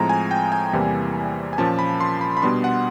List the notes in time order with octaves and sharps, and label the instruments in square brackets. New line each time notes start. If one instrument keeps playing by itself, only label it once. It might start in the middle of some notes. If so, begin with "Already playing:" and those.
Already playing: [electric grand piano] A2 F3 G#3 C4 A#5
G#5
G5
G#5
E2 C3 E3 G3 A#3
G#5
A#2 F3 A#3 C#4 A5
B5
C6
B5
B5
B2 G3 B3 D4 C6
F#5